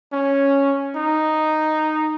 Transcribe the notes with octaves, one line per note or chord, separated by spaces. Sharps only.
C#4
D#4